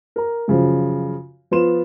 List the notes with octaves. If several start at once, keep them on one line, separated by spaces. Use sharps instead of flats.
A#4 A#5
F#2 C#3 F3
F3 B3 F4 C6 E7